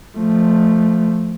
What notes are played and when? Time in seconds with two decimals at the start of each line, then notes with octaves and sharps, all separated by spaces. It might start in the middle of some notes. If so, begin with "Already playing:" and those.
0.17 F3 A3